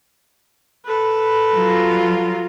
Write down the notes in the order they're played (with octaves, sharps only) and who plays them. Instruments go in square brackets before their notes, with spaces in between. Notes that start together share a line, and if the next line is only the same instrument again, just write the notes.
[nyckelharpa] A4 B4
[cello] F#3 F4